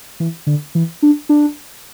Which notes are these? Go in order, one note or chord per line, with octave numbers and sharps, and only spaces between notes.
E3
D3
E3
D4
D4